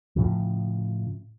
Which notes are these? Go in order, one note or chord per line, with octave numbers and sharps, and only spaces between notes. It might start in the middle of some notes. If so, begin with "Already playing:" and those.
A2 C#3 F3